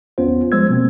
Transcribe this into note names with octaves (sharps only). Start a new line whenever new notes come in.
G#1 E2 B3 C#4 F4 C5
F3 G3 G#3 C5 E6 G#6
B2 A#3 C4